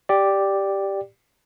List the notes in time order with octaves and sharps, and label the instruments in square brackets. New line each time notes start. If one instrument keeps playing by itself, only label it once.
[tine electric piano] G4 D5